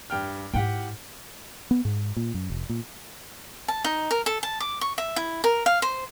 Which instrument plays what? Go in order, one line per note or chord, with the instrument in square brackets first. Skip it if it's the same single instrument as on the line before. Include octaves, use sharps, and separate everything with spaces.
[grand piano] G2 G5 F6
[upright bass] G#2 E4 [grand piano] G4 F#5 G5
[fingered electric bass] B3
G#2
A#2
F#2
F1
A#2
[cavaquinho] A5
D#4
A#4
A4
A5
D6
C#6
E5
E4
A#4
F5
C5